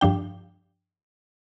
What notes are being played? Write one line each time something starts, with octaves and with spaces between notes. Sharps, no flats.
G2 F3 D4 G5